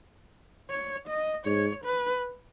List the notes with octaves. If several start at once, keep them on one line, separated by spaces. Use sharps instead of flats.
C#5
D#5
G#2 C#5
B4